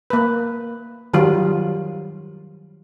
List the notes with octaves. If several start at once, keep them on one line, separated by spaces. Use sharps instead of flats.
A#3 B4
D#3 F#3 G3 F4